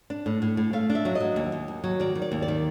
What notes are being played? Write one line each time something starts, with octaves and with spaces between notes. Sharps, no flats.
D4
A2
A2
A2
A3 F5
D4
E5
F#3
D#5
F#3
D#2
D#2
D#2
F#3
D#3 D5
D#3
D5
D#2
D5
D#3